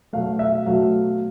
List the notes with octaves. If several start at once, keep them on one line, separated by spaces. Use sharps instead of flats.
B2 F#3 A3 F5
E5
B2 F#3 A3 F5